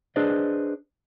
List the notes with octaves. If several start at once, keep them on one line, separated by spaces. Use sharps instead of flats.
D4 G#4 B4 C5 D5 D#5